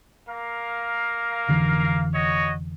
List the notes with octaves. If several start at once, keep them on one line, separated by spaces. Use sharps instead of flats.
A#3 A#4 F5
F1 D3 E3
F#4 C#5 D#5